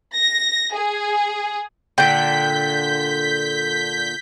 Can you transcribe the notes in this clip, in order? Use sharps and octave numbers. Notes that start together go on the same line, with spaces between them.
A#6
G#4
A#2 D3 G5 G6 B6